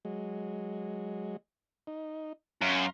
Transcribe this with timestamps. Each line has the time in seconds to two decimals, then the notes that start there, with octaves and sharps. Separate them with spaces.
0.05 F#3 G#3
1.87 D#4
2.62 F#2 F5 A#5 C6